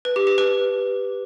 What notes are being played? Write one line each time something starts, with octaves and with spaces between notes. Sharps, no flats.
B4
G4
G4
B4